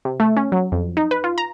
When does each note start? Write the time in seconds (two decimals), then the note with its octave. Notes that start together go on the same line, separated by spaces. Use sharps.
0.05 C3
0.20 A3
0.37 C#4
0.52 F#3
0.72 F2
0.97 D#4
1.11 B4
1.24 F4
1.38 A#5